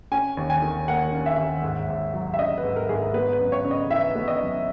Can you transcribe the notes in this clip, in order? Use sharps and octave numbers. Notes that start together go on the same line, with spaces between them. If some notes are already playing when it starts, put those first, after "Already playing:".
C#4 G#5
D#2
G#5
D#3
A#3 F#5
C#4
E5
D#2
G#2
G#2
F#3
E5
C#4 D#5
B4
G#2
A#4
G#2 G#4
A#4
B3 B4
B4
F#2
C#5
C#3
D#5
E3 E5
B3
D#5
F#2